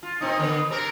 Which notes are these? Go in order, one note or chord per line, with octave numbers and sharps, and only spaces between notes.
F4
A#2 C4 D#4
D3 B3
C3 C4 A#4